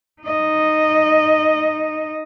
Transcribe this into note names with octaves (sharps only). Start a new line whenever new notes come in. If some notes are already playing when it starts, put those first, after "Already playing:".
D#4 D#5